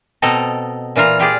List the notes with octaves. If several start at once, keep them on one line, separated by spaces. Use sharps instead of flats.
B2 C4 A4 D#5 A#5
A#2 E3 F4 A#5
F4 G4 G#4 D5